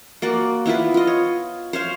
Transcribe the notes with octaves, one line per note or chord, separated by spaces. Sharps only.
A#3 F#4 D5
B3 E4 F4 B4
F4 D#5
C#5
C5 C#5 F5